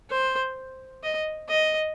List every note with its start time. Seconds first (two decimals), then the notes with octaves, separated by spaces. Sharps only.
0.10 C5
1.03 D#5
1.49 D#5